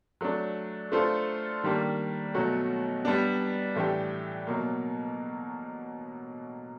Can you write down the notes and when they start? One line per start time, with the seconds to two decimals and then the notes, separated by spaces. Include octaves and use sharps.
0.21 F#3 A3 D4
0.92 A3 D4 F4 A4 C5
1.64 D#3 G3 A#3 D4
2.35 B2 F#3 A3 C#4 F#4
3.05 G3 B3 D4
3.76 A2 E3 A3 D4 G4
4.47 B2 F#3 A#3